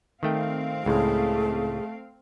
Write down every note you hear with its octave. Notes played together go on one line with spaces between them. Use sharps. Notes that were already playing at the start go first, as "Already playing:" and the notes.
D#3 A3 C4 F5 G5
C#2 A2 A3 G#4